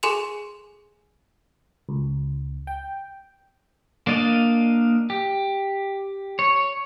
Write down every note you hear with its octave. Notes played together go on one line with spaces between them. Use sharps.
G#4 A4 G#5 C6 E7 F7
C#2
G5
A#3 D4 D5 D#5 F5
G4
C#5